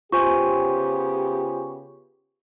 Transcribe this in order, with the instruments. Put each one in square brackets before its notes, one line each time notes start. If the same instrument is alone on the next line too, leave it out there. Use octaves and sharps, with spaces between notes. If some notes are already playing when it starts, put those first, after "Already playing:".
[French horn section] C#3 B3 G4 [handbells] F4 C5 G#5 [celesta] C#6